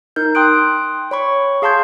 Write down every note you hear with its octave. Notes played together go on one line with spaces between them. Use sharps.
D#4 A#4 G6
G5 C6 D#6 F#6 D7
C#5 B5 C#6
G#4 F5 A5 C6 G6 G#6